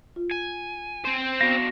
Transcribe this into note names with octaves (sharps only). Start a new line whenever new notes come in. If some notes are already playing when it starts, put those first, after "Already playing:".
F4
G#5
C4 C5
B3 D4 F#4 F5 A#6